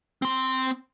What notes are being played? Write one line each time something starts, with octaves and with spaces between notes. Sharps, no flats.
C4 C6